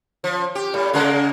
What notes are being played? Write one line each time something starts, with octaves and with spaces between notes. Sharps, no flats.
F3
G4
A2 G3
C#3 G#3 A#3